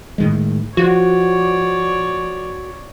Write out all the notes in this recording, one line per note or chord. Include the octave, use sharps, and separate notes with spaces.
A2 D#3 G#3
F3 F#4 C#5 D5